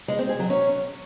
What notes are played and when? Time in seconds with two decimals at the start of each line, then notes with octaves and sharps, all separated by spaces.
0.08 G#3
0.19 C4
0.29 G#4
0.39 F#3
0.50 C#4